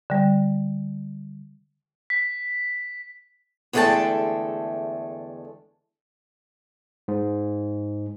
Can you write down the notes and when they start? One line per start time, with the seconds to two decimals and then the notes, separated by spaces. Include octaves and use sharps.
0.10 D3 G3
2.10 B6
3.73 E2 D3 G#3 A3 G5 A5
7.08 G#2